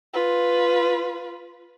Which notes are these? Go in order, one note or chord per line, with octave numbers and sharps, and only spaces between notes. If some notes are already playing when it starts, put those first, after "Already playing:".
F4 B4